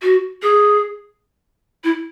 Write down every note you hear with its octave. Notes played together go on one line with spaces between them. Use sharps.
F#4
G#4
E4